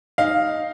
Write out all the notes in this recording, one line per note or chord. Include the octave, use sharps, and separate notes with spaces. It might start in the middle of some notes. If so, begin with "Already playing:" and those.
D#4 F5